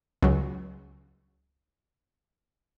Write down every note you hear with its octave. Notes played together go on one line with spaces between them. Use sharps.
C#2 F#3